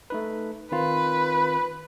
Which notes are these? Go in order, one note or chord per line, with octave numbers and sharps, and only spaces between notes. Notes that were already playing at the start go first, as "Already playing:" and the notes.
A3 D#4 B4
D#3 C4 F4 B4